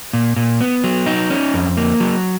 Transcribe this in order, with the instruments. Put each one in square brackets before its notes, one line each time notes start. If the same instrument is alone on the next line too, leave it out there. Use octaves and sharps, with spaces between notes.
[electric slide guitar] A#2
A#2
B3
F#3
D#4
C#4
F2
A#3
F#3